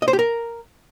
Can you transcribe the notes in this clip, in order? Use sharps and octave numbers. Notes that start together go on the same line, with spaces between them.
D#5
C5
G4
A#4